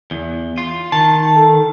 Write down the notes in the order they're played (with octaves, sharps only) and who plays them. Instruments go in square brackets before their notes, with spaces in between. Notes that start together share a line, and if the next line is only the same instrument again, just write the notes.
[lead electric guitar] E2
F4
[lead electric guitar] D#3 [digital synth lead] A5
[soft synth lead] A4